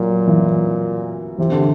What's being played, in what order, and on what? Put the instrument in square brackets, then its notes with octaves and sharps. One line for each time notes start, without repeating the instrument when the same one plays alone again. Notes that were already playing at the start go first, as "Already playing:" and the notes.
Already playing: [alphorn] A#2 [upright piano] F#3
[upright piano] E3
[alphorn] C3 [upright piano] E3
[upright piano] D3